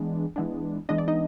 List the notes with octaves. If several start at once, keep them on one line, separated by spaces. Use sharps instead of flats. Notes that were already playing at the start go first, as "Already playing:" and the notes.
Already playing: E3 G#3 B3 D4
E3 G#3 B3 D4
E3 G#3 B3 D4 D#5
D5
D#4 D#5